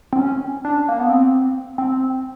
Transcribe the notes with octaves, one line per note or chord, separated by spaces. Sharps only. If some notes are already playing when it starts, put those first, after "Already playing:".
C4
C#4
D4
A#3
B3
C4
C4